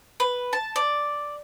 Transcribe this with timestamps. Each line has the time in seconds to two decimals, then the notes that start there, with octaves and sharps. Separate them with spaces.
0.20 B4
0.53 A5
0.76 D5